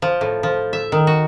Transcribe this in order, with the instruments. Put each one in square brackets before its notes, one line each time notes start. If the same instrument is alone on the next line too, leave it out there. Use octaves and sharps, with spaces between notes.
[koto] F3
A2
F3
E5
D#3
F#4